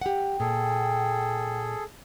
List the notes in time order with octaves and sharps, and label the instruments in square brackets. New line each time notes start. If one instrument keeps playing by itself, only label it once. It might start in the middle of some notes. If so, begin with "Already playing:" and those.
[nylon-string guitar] G4 F#5 [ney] G5
[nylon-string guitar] A#2 [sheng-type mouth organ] G#4 A4